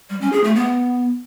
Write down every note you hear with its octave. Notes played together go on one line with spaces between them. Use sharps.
G3
C#4
G#4
A3
B3